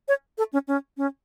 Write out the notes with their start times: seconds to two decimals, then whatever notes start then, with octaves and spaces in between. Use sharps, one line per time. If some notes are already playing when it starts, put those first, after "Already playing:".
0.08 C#5
0.38 A4
0.53 C#4
0.68 C#4
0.97 C#4